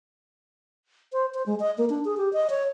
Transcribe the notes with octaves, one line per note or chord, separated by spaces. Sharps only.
C5
C5
G#3
D#5
A#3
D4
G#4
G4
D#5
C#5